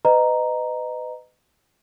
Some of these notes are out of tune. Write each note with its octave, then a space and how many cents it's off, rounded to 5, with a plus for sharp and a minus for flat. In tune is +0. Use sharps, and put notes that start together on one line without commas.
B4 +30 D#5 -10 A#5 +0